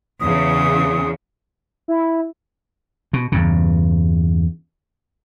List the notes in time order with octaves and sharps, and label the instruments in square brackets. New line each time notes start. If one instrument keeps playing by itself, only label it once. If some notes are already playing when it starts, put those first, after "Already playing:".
[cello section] E2 C#3 [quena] D#6
[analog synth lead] E4
[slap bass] B2
E2 G2 C#3